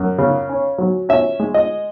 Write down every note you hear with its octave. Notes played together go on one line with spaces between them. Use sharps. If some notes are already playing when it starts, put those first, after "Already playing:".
Already playing: F#2
C#3
C#4
F#3
C#4 E5
G#3
D#5